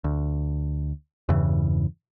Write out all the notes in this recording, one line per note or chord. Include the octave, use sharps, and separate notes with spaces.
D2
E2 G2 C#3 E3